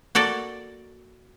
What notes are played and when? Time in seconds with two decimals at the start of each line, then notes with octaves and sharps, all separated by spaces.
0.15 A#3 F#4 A4 D5